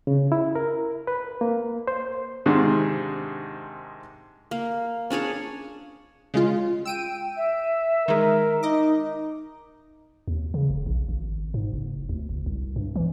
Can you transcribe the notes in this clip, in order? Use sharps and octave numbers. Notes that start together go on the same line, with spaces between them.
C#3
E4
A#4
B4
A#3
C5
G#2 C3 D#3 D4 G#4
A#3
C#4 D4 G#4 C#5
C#3 G#3 F4
G5 E6 D7 D#7
E5
D#3 G#3 A#4
D#4 D#5 D6
D#2
C#3
F1
A#1
G#1
G#2
F#1
D2
F#1
C2
G2
E3